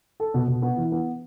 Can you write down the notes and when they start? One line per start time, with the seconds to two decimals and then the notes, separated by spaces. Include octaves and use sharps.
0.20 A4
0.34 B2
0.48 B2
0.62 B3
0.77 E3
0.92 B3